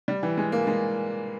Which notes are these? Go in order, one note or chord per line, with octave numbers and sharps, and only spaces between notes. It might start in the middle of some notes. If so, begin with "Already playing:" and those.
G3
E3
G#3
A#3
G#3